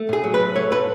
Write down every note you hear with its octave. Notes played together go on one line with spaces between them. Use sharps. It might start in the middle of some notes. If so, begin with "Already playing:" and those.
Already playing: A3
A2 G#4
F#3
B4
A2
A3 C#5
A2 B4